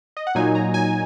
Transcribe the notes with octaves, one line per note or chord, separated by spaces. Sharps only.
D#5
F#5
A#2 F#3 D#4 G#5
A#5
G#5